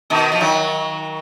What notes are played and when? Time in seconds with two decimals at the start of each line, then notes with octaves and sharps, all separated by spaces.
0.10 B2 D#3
0.32 F3
0.41 D#3 F#3